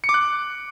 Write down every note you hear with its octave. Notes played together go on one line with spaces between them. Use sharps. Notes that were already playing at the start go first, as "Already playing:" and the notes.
C#7
D6
F#6